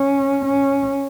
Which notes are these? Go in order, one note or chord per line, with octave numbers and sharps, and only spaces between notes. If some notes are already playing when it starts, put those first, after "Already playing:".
Already playing: C#4
C#4